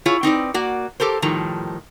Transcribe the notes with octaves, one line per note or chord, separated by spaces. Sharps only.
E4 F4 G#4 C#5
C4 D#4 B4 D5
A#3 F#4 D5
G4 A4 A#4 C5
A2 D#3 F3 G3 A#5